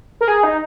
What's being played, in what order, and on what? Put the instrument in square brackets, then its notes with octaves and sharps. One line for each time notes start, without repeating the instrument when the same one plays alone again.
[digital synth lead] A#4
G#4
D#4